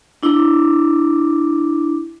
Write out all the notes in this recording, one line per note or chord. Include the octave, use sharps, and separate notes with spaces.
D4 E4 D6